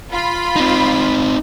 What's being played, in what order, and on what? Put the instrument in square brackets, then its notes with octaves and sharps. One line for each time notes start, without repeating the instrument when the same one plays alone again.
[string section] F4 B5
[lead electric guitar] C4 D#4